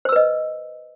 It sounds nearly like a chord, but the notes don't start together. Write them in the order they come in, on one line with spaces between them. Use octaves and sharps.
C5 E6 B4 D#5